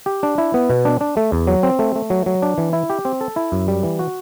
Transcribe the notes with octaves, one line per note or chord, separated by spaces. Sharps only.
G4
D4
E4
B3
B2
D4
D4
A3
E2
F#3
C4
A3
A3
F#3
F#3
D4
E3
E4
G4
C4
A4
E4
F#2
G3
E3
F#4